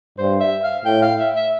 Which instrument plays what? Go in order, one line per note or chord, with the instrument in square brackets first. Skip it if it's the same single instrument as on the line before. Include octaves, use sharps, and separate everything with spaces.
[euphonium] G2 [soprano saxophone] C5
[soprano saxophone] E5
F5
[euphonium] A2 [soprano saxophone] G5
[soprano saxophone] F5
E5
E5